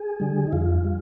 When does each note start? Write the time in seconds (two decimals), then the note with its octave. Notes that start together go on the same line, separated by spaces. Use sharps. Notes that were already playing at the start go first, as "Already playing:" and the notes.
Already playing: G#4
0.20 D3 G3
0.47 D#4
0.52 F2 F4
0.84 G3